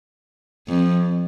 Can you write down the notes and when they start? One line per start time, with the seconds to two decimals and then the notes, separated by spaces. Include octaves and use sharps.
0.68 F2